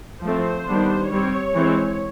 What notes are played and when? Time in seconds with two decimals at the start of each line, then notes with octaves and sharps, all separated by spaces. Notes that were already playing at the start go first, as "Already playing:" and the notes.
0.24 F3 A3 C4 C5
0.68 D#3 G3 B3 D4
1.11 G3 C4 C#5
1.54 E3 G#3 C4